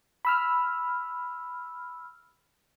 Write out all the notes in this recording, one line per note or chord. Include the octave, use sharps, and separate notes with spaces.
B5 E6 F6